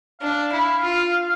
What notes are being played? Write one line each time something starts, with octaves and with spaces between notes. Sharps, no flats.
D4 F5
E4
F4